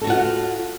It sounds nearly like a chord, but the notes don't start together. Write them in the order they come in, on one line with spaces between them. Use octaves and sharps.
A4 F#4 F4 F#5